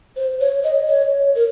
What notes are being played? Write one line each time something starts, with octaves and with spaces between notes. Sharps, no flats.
C5
C#5
D#5
C#5
A#4